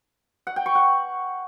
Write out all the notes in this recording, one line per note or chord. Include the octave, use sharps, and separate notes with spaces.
F#5
G5
C#6
F#5